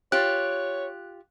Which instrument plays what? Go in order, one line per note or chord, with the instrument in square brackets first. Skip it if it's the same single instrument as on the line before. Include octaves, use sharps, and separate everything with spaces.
[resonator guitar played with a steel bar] F4 G4 [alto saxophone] C#5 [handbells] F#6